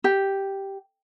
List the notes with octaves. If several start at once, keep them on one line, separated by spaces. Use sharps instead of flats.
G4